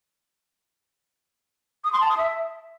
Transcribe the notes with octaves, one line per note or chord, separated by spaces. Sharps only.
D#6
C6
A5
D#6
E5